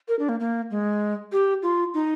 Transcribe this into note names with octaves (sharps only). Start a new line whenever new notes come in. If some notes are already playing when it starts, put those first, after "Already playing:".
A#4
D4
A#3
A#3
G#3
G4
F4
D#4